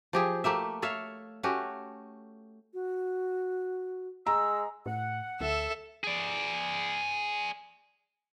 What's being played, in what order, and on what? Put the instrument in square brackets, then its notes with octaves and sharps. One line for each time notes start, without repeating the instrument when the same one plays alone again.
[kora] F3 G4 G#4
A3 A#3 G4 E5
A4 C#5 E5 F5
A3 C#4 F#4 G4
[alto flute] F#4
[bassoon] G#3 [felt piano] A#5 [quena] E6
[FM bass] A2 [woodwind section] F#5
[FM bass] D2 [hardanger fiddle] A4 E5
[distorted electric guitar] G#4 D5